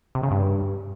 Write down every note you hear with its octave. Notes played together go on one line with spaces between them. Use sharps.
C3
C#3
G2